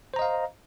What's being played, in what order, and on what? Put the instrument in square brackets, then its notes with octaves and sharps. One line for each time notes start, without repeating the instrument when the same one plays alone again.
[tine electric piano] C5
A#5
D#5
F5